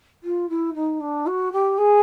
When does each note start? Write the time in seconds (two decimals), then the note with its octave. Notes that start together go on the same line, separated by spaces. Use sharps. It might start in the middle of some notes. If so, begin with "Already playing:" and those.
0.23 F4
0.49 E4
0.74 D#4
1.00 D4
1.26 F#4
1.52 G4
1.78 G#4